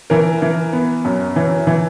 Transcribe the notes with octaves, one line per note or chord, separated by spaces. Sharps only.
E3 A#4
E3
B3
F#2
E3
E3